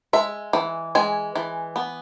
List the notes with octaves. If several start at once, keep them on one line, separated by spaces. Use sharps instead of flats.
G#3 E5
E3
G#3 G#5
E3
B3